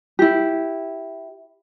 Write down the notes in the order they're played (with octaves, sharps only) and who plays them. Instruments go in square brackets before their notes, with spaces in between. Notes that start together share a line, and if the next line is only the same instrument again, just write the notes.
[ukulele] E4 G4